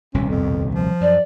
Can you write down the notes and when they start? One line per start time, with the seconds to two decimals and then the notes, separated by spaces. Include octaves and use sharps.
0.14 D#1 C2 B2 C#4
0.30 F2
0.75 F3
1.01 F#2 D5